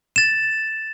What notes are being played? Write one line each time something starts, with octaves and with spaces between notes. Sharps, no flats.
A6 E7